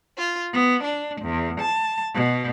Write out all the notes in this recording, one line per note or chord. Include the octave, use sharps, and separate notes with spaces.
F4
B3
D4
E2
A5
B2